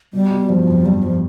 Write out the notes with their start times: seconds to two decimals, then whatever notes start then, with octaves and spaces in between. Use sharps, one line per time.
0.13 B2 G3
0.31 B2
0.49 G2 F3
0.67 F2
0.85 G2 G3
1.03 F3